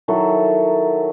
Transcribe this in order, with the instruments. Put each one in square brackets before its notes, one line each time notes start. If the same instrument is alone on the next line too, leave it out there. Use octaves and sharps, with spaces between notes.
[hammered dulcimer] D#3 F#3 E4 A4